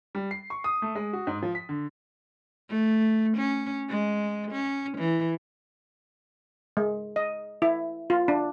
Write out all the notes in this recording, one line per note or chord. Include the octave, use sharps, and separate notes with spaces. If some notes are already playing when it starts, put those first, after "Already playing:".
G3
C7
C#6
D#6
A3
G#3
F#4
G#2
F3
B6
D3
A3
C#4
G#3
C#4
E3
G#3
D#5
E4
F4
D4